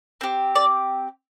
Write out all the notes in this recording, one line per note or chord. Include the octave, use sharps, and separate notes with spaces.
C4 G4
D5